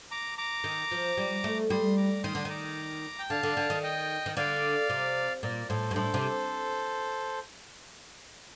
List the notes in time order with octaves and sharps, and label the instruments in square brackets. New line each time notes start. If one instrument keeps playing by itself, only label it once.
[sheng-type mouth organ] A#5 D6
A#5 D6
[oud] D#3
F3
G3
A3
[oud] G3 [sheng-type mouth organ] C6 D#6
[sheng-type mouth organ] A#5 D6
[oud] D#3 [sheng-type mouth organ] C6 D#6
[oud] D3
[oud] D#3 [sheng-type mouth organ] A#5 D6
[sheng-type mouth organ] G5
[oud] D3 [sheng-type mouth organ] F5 A5
[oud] D3
D3
D#3
[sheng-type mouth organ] D#5 G5
[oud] D#3
[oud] D3 [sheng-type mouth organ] D5 F5
[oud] C3
[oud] A#2 [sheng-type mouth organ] A#4 D5
[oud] A2 [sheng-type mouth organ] A4 C5
[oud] G2
[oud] A2 [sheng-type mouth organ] A4 C5
[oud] C3